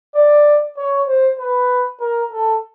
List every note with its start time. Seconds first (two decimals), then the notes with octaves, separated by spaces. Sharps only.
0.15 D5
0.77 C#5
1.07 C5
1.38 B4
2.00 A#4
2.31 A4